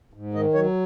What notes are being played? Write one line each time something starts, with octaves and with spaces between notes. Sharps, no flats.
G#2
D#3 D#5
F#3 C#5